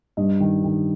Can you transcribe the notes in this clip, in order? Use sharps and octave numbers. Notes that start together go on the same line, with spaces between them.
G2 D#5
D#3
D#3